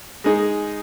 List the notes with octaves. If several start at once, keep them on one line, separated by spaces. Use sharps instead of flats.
G#3 D#4 G#4